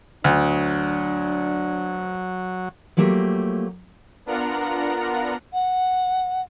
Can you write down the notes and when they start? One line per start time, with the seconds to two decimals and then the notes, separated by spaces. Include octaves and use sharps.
0.24 D2 F#3 D4
2.97 F3 F#3 A3 A#3 G4
4.26 B3 D4 F4 A#4 F#5 A#5
5.53 F#5